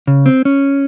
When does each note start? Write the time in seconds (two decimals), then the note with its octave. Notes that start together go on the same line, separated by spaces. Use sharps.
0.07 C#3
0.26 C4
0.45 C#4